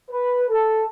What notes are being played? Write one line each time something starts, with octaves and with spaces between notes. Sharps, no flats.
B4
A4